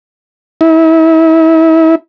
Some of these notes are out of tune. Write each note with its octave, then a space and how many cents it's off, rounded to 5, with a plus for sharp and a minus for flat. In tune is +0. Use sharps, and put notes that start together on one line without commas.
E4 -35